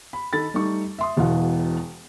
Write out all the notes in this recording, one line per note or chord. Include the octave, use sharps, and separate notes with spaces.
B5
D#3 A4 B5 A6
G3 A3 D#4 A4 C#6
E5 C6 D#6
E1 E2 B2 E3 F5 F#5